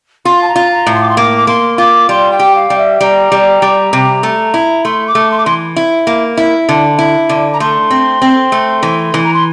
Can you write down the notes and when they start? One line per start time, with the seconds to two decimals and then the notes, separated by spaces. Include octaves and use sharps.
0.25 F4 C6
0.42 A5
0.48 A#5
0.56 F4
0.71 A#5
0.87 A2
0.95 C6
1.01 D6
1.09 C6
1.17 A#3 D6
1.37 D6
1.47 A#3 C6
1.78 F4 D6
2.09 G3 C6
2.31 G5
2.39 G4
2.55 F5
2.70 G3
2.77 E5
3.01 G3 A#5
3.32 G3
3.62 G3
3.93 C3
4.23 A3
4.54 E4
4.84 A3 C6
5.07 D6
5.15 A3
5.31 C6
5.38 D6
5.45 E3 C6
5.76 E4
6.07 A#3
6.37 E4
6.69 D3
6.99 E4
7.29 D3
7.53 A#5
7.60 A3 C6
7.91 C4
8.22 C4
8.52 A3
8.83 E3
9.14 E3
9.24 A#5
9.33 C6